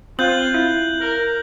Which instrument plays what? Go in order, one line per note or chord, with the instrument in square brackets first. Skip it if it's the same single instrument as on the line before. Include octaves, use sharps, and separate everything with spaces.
[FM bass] C4 [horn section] F4 [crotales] F#6 G6 F#7
[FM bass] E4
[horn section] A#4